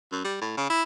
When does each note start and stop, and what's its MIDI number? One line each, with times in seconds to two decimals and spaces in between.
0.12 0.23 42
0.24 0.37 55
0.41 0.57 45
0.57 0.69 49
0.70 0.83 64